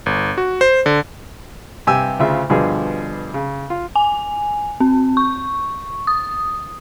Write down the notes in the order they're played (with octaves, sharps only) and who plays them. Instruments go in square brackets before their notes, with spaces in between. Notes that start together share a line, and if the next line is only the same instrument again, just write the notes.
[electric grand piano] G1
F#4
C5
D3
[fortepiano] G2 C3 G4 G#5 E6
D2 C#3 F4 E5
G2 B2 D3 F3 G#4
C#3
F4
[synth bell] G#5
C4
C#6
D#6